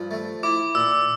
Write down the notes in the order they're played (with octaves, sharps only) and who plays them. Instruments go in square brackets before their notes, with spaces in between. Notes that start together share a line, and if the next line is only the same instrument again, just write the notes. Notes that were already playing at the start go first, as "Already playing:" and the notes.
Already playing: [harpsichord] G2 F3
A3
[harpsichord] E4 [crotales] D6
[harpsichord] A#2 [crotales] E6